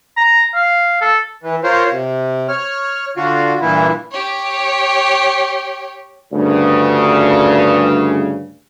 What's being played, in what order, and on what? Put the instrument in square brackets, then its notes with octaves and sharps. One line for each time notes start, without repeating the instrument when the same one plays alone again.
[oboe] A#5
F5
A4
[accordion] E3
F4 A#4 C5 C#5
C3
C#5 F6
D3 F4 F#4
G2 A#2 E3 E4
[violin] G4 C#5
[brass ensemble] D2 G2 C#3